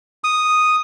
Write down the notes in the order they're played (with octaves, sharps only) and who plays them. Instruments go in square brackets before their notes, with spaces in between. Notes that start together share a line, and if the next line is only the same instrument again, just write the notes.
[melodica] D#6